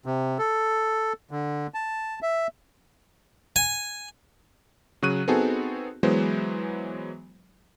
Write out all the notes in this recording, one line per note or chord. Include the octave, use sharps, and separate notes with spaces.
C3
A4
D3
A5
E5
G#5
C#3 F#3 C#6 F#6 D#7
B3 C4 D#4 F#4 G#4 A4
E3 F#3 G#3 B3 C5